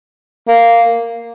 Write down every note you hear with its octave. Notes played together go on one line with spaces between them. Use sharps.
A#3